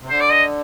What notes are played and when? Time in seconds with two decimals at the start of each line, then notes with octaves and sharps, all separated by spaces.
0.01 C3
0.09 D3 C5
0.20 D5
0.32 D#5